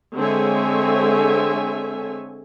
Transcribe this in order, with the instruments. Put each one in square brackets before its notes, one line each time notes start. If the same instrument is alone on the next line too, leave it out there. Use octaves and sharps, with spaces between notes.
[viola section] D3 G#3 C4 C#5 E5 G#5